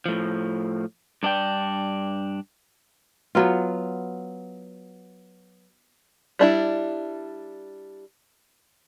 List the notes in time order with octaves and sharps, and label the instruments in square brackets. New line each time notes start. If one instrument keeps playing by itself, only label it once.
[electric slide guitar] A2 F3
G2 D4 D5 G5
[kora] F#3 B3 F4
[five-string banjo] G3 D4 E4